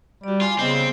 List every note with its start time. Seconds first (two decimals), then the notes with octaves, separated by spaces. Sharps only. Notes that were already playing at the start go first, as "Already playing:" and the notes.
0.24 G3 F#4 D5
0.41 F4 G#5 C6 D6
0.59 C#3 B3 C4 C5 D#5